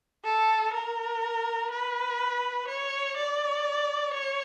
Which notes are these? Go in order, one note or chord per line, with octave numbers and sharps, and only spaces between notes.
A4
A#4
B4
C#5
D5
C#5